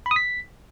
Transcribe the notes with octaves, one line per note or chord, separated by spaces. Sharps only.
B5
D#6
B6